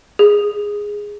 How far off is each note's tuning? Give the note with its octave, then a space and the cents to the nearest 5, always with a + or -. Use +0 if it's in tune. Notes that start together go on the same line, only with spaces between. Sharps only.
G#4 -5